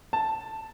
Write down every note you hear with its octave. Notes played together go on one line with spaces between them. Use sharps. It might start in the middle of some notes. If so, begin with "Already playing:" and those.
A5